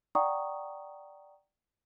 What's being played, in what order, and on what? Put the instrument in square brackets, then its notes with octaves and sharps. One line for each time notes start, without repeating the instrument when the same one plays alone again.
[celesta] D5 F#5 G5 A#5 C#6 D#6